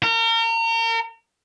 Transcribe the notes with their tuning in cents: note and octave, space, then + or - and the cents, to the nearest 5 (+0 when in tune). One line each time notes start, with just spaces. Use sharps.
A#4 -35